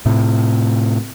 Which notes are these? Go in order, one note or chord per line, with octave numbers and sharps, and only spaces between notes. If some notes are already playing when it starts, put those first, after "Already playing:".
A2 C3